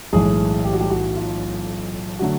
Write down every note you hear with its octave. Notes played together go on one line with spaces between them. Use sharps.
B1 A2 E3 G#3 G#4
G4
F#4
G3 G4
F#4
F4
D3 F#3 A3 F#4